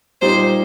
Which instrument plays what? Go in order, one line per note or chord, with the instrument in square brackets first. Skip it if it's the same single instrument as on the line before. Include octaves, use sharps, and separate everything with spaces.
[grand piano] A#2 G3 D#4 G4 [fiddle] C5